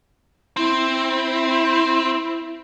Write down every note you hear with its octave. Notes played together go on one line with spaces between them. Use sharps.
C4 E4